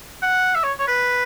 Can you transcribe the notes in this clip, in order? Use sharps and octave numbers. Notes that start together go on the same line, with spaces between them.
F#5
E5
C#5
C#5
B4